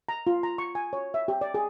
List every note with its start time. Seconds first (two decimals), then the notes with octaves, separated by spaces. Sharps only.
0.09 A#5
0.27 F4
0.43 A#5
0.58 C#6
0.75 G#5
0.93 C#5
1.14 E5
1.28 G4
1.41 D5
1.54 G#4